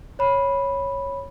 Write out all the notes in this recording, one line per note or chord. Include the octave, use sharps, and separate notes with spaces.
C#5 B5